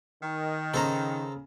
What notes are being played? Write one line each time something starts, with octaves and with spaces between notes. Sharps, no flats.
D#3
C#3 A4 C5 A#5